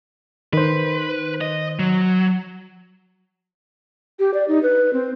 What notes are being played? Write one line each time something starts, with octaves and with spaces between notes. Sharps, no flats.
D#3 B4 C5
D#5
F#3
G4
D5
D#4
B4
C4